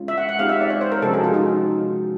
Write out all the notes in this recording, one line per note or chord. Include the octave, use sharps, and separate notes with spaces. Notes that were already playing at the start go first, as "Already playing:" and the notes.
Already playing: G#3 C#4 F4
E5
F#5
F#5
G#3 C4 D#4 G4 F5
E5
D5
C#5
C5
A#4
C3 F3 G#3 C#4 F#4 A4
G#4
F4
D#4